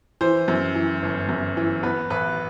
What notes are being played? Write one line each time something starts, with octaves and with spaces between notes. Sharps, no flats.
E3 C5
F#2
E3
G1
F#2
E3
B3 B4
A1 B4